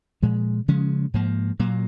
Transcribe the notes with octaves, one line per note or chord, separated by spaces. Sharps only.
A#2 F3 G#3
C#3 F3 G#3 C#4
G#2 F3 A#3
A#2 F#3 A#3